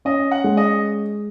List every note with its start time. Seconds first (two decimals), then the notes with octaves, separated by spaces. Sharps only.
0.05 C#4 D#5
0.31 F#5
0.44 G#3
0.57 D#5